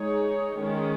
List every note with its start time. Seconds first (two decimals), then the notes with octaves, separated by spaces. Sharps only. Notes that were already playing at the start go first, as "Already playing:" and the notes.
Already playing: G#3 D#4 G#4 C#5
0.57 D#3 G#3 C#4